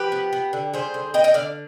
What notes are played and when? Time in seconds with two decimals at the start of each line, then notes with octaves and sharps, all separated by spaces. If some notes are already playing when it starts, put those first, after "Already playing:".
Already playing: F3 G4 B4
0.12 B3
0.33 B3
0.53 D3
0.74 G3 G#4 C5
0.94 D3
1.14 B3 D#5 G5
1.24 D#5 G5
1.34 D3 D5 F5